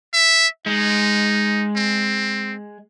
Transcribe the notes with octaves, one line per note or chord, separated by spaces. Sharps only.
E5
G#3 D#4
C4